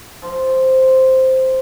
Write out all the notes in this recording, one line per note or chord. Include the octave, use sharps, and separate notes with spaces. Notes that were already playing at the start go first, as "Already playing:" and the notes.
F3